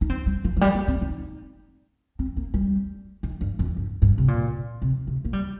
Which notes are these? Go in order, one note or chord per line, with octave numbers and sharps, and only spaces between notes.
D#4
C4
G3
F3
F3
G3
A#3
C4
D#4
C4
A#3
G3
D#3
G2
F2
G2
G2
C3
A#2
C3
C3
A#3
G3